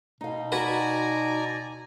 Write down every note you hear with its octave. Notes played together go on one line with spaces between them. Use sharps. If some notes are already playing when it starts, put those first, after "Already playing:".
B2 D#4 F5
F#4 B4 D5 G#5 A#5